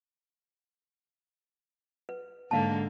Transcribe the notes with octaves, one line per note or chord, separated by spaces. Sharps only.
B4
G#2 D3 A#3 F5 A5